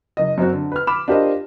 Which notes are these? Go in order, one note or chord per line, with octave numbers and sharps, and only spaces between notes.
F#1 D#5
F#2 C4 F#4
D3
B4 F6
B5 D6 F6 E7
D4 F4 G4 A#4 C5 D#5